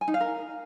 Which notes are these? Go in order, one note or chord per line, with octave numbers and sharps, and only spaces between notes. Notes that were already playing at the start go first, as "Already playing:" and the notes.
G#5
D#4
F5
A#4